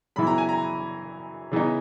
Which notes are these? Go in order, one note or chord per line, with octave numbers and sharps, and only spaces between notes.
F#2 C#3 E3 B3 E4 B5
A#5
G#5
A#5
C#3 E3 B3 D#4